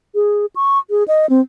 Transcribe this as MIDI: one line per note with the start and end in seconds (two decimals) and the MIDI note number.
0.15 0.46 68
0.56 0.79 85
0.90 1.03 68
1.08 1.26 75
1.30 1.41 60